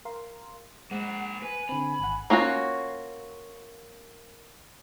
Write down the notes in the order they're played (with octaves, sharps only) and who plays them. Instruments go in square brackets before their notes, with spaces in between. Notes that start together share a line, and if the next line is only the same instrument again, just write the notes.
[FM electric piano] A#4 F5 C6
[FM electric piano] G#3 [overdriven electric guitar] A#3 C5 [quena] F#5
[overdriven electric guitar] B4 [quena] G#5
[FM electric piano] D3 C4 [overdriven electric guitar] B5
[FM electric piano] G#1 F#5
[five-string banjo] A#3 C#4 F4 F#4